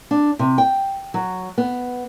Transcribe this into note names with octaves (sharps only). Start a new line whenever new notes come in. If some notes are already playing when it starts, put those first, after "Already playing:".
D4
C3
G5
F#3
B3